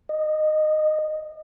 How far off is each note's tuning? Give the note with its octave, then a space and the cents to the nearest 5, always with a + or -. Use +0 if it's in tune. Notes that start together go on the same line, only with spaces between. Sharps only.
D#5 -15